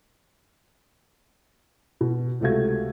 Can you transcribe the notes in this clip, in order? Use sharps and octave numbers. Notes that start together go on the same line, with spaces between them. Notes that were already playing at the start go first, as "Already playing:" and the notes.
B2
C#2 C3 A3 F#4 F5 G#6